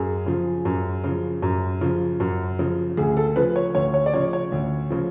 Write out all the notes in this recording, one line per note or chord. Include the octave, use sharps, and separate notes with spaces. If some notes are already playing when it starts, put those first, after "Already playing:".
Already playing: F#2 G#4
C#3 F3
F#2
C#3 F3
F#2
C#3 F3
F#2
C#3 F3
D2 G#4
A4
C#3 F3 B4
C#5
D2 C#5
C#5
D5
C#3 F3 C#5
C#5
D2
C#3 F3